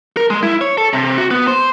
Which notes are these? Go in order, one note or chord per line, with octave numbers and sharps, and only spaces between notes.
A#4
G#3
E4
C#5
A4
C3
F#4
B3
C5